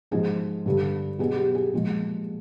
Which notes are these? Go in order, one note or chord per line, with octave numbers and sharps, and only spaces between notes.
G#2 F3 G#3 G#4
G2 D3 G3
B2 F#3 G#4
G4
G#4
A#2 F3 G#3